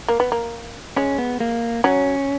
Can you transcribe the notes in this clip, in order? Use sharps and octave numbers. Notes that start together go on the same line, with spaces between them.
A#3
B3
A#3
G#3 C#4
B3
A#3
F#3 C#4